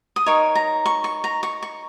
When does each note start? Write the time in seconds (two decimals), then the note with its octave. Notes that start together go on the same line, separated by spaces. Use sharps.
0.16 D#6
0.26 D#4 A#4 C#5 C#6
0.55 A#5
0.86 C#6
1.04 C#6
1.24 A#5
1.43 C#6
1.63 C#6